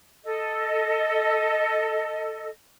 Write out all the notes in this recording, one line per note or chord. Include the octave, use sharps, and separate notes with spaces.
A4 D#5